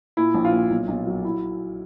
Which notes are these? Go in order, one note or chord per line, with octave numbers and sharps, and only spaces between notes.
A#2 E4
A#1
F4
A#2
B1
B1
F#3
E4